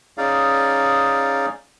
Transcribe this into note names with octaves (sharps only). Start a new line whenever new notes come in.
C#4 D#4 G#4 D5 F5